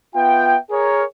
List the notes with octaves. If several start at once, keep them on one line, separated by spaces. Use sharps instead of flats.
B3 F4 E5 G5
G#4 A#4 C#5